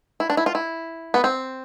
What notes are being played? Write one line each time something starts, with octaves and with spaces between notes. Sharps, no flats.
E4
D4
E4
F4
E4
B3
C4